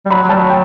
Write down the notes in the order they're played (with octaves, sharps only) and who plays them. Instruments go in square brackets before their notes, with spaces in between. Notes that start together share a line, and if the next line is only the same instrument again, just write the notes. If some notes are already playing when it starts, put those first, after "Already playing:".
[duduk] G3
[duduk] F#3 [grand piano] B5
[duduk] F#3
[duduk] G3 [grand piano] A5
[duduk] F#3
[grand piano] G5